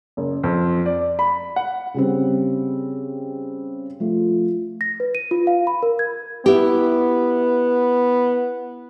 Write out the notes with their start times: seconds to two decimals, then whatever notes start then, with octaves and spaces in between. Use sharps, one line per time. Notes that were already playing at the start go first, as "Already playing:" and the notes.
0.17 F#1
0.43 F2
0.86 D5
1.19 B5
1.56 F#5
1.94 C#3 G3 C4
4.00 F3 A3
4.81 A#6
5.00 B4
5.15 D#7
5.31 F4
5.47 F5
5.67 B5
5.83 A#4
5.99 G#6
6.46 B3 E4 G4